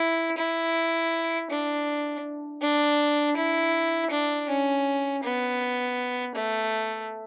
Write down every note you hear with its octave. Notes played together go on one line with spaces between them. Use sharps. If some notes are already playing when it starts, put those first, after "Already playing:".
Already playing: E4
E4
D4
D4
E4
D4
C#4
B3
A3